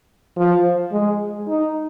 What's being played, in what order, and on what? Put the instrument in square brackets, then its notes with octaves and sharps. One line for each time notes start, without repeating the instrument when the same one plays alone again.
[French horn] F3
G#3
D#4